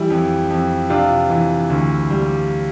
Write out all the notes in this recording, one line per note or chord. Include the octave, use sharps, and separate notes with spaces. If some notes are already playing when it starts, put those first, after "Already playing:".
Already playing: E3 G3 E4
F2
F2
C3 D4 F4
E3
D2
G3